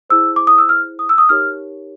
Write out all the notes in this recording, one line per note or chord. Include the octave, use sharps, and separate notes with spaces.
E4 G#4 C5 E6
D6
D#6
E6
F6
D#6
E6
D#6
D#4 G4 A#4 C#5 F6